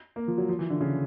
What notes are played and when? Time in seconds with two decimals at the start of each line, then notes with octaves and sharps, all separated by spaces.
0.16 A#3
0.28 F3
0.38 F#3
0.49 F3
0.59 E3
0.70 D3
0.81 C#3